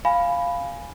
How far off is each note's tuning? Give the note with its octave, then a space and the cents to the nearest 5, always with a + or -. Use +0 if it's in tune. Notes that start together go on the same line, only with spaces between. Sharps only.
F5 +0 G#5 +0 B5 +0